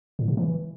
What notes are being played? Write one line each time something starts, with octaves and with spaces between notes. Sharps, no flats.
A2
C3
E3